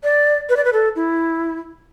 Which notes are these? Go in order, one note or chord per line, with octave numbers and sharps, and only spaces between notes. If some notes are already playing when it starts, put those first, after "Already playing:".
D5
B4
D5
B4
A4
E4